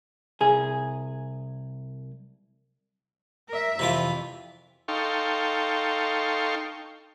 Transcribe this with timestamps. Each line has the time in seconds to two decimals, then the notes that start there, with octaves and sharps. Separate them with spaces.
0.41 C2 G#4
3.49 A#4 E5
3.79 F2 C3 E3 F4
4.88 D#4 A4 F5 G5 C6 C#6